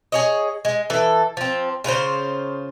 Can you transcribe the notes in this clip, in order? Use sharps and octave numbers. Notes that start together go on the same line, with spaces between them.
G#4 C#5 D#5
G#3
E3 A4
F3 C4
C#3 F4 B4 C5